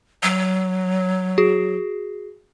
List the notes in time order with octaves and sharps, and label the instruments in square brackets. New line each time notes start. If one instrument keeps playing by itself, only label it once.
[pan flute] F#3
[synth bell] F#4 G#4